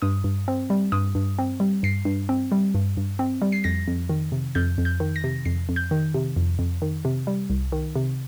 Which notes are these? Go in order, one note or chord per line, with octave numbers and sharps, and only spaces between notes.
G2 D#6
G2
C4
G3
G2 D#6
G2
C4
G3
G2 C7
G2
C4
G3
G2
G2
C4
G3
C7
F2 A#6
F2
D#3
C3
F2 G6
F2
G6
D#3
A#6
C3
F2 C7
F2
G6
D#3
C3
F2
F2
D#3
C3
G3
C2
D#3
C3